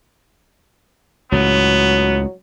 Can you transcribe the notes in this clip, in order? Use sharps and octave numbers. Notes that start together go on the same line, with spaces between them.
C#2 A2 F#3 B3